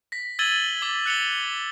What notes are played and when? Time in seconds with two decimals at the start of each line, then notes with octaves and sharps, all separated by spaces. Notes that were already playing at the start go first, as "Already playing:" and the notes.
0.12 A#6 B6
0.39 E6 G#6 A6 D#7 F#7 G7
0.82 D6 G#6 B6
1.06 F#6 C#7 F7 G7